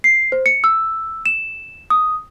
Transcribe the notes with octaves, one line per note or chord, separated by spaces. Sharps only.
C7
C5
C#7
E6
E7
D#6